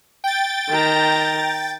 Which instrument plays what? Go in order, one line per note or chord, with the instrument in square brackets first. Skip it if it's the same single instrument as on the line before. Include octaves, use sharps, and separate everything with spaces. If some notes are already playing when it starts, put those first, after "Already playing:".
[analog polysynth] G5 A6
[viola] D#3 A#5